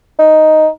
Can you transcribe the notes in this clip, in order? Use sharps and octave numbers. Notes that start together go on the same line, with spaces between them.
D#4